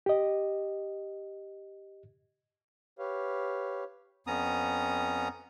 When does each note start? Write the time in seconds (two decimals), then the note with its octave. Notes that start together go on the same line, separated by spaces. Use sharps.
0.06 G4 D#5
2.99 G4 B4 C#5 F5
4.27 F2 B3 C#4 A#5 D#6